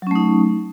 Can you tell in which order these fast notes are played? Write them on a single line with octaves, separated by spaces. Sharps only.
F#3 C#4 A3 D#4